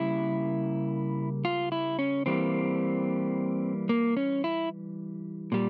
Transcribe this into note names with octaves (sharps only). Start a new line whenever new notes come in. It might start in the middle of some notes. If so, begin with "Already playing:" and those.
Already playing: C#3 G3 A#3 E4
F4
E4
C#4
E3 G3 A#3 C4
A#3
C#4
E4
A#2 G3